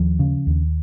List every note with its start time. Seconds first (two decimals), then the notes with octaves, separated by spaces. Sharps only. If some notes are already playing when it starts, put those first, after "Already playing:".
Already playing: D#2 F3
0.19 C#3
0.47 D#2